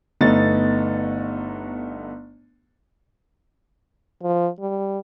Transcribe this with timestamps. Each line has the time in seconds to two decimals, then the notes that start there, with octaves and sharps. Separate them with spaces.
0.21 G1 A3 B3 D#4 A6
4.23 F3
4.60 G3